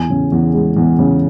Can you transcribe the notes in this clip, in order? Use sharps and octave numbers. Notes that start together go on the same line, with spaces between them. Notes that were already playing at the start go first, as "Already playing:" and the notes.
Already playing: E2 G#5
C#3
E2
G#3
E2
C#3